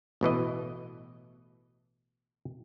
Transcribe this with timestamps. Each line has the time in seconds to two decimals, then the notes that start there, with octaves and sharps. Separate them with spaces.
0.21 A1 B2 E3 D#5